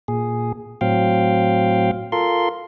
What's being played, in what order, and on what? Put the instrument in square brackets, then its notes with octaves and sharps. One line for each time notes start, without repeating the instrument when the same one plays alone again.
[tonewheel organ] A#2 G#4
A2 F#3 C4 F5 G5
F4 A4 A#4 C6